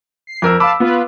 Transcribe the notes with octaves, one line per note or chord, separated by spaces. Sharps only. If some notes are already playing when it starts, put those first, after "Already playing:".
C7
F2 A#4 E6
F5 A5 B5 D6 E6
B3 F4 B4